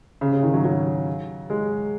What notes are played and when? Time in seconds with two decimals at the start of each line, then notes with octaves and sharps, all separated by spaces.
0.21 C#3
0.32 C#3
0.43 D#3
0.54 F#3
0.64 F#3
1.50 G#3